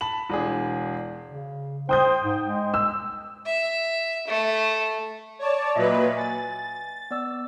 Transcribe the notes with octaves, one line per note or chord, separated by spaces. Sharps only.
A5 B5 F#7
E1 D4 G#4
C#3
C5 G5 D#6 G6
G#2
G#3
E6
E5
A3
C#5 D5 A5
A#2 F#3 B4 D#5 E5
G#5 A6
B3 D5 E6